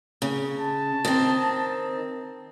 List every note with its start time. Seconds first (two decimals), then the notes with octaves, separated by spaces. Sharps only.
0.22 C#3
0.59 A5
1.05 D#3 C4